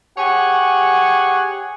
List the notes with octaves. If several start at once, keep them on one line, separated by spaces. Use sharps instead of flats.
G4 G#4 C#5 F#5 G#5